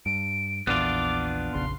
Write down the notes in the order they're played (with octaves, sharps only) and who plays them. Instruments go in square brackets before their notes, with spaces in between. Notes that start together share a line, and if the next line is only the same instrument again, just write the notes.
[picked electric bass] G2 [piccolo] D7
[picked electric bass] A#1 E2 [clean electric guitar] B3 D4 F4 [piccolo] D6
[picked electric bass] F1 A#1 C#3 [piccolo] C6